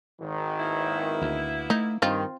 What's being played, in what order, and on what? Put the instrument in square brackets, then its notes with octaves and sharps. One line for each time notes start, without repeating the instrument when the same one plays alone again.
[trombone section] G#1 D#3
[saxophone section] A#3 B3 E4
[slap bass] D2
[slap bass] A3 [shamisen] D#4
[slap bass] G2 [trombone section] D#3 [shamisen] C4 F4